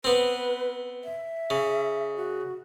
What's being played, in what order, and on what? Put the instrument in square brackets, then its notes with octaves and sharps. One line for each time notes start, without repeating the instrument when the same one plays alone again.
[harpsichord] B3 C4 [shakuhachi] B4
[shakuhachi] E5
[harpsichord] C#3
[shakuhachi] F#4